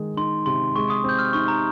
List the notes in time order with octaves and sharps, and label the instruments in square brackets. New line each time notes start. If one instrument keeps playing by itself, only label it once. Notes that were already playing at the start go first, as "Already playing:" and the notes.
Already playing: [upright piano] D#3 G#3
[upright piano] D#4 [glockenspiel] C6
[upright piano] C3 [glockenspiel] C6
[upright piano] G#3 [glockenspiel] C#6
[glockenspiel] D#6
[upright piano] C4 [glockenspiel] G6
[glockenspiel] F6
[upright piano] D#4 [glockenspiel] C#6
[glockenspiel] A#5